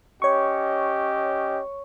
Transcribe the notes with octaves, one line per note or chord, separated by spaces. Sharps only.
C#4 G4 C#5 D#5 C#6